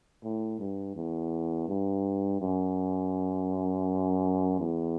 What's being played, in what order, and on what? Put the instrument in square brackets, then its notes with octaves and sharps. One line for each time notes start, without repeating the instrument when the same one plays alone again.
[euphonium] A2
G2
E2
G2
F#2
E2